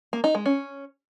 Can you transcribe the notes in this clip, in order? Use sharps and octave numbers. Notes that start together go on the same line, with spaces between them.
A#3
D#4
G#3
C#4